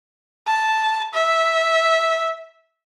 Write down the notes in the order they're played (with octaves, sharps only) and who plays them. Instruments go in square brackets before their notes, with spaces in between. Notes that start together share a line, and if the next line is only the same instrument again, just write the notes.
[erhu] A5
E5